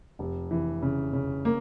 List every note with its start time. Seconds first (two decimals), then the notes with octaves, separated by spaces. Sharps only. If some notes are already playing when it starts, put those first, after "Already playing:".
0.19 F1
0.51 E3
0.82 C#3
1.13 C#3
1.45 A#3